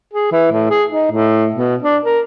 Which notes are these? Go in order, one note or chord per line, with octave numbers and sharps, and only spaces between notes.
G#4
E3
A2
G#4
D#4
A2
B2
D4
A#4